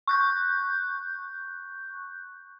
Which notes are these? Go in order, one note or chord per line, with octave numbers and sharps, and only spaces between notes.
C#6 F#6 G6